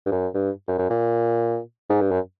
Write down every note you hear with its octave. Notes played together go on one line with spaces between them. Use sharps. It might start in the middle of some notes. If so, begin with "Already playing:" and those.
G2
F#2
G2
F#2
F#2
A#2
G#2
G2
F#2